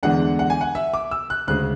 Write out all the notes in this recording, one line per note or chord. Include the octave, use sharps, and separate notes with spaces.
E2 D3 G#3 D4 F#5
F#5
G#5
F#5
E5
D6
E6
F#6
D2 C#3 G#3 C#4 F#6